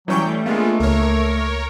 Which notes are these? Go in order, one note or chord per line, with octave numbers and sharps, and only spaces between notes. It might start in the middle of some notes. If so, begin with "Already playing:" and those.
E3 F#3 G3 C#4 G5 C#6 G6
G3 A3
G#3 A#3 B3 D4 F4
C#2 A#4 C#5